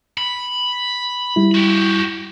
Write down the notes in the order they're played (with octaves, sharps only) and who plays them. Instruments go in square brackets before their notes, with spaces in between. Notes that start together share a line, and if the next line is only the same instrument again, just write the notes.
[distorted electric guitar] B5
[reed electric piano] G3 E4
[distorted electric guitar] F#4 G4